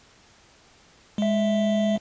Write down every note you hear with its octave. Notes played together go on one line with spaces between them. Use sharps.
G#3 E5